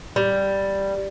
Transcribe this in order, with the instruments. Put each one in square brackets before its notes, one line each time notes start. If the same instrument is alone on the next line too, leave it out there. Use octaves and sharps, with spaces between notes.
[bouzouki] G3